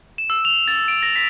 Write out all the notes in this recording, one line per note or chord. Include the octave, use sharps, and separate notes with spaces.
E7
E6
F7
A6
D7
A#6
B6